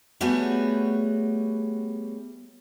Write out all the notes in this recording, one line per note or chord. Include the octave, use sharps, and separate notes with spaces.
G3 A3 B3 F#4 G#4 C#5